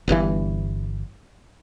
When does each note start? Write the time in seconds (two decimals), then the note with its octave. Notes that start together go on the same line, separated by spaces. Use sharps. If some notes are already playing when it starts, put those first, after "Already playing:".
0.08 G1 G2 B2 E3